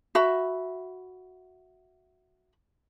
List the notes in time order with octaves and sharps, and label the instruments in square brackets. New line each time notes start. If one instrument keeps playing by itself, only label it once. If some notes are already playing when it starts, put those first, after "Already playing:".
[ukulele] F#4 E5 B5